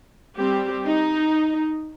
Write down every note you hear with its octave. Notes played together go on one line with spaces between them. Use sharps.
G3 C4 G4
D#4